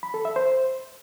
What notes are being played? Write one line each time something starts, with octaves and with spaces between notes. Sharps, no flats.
B5
A4
E5
C5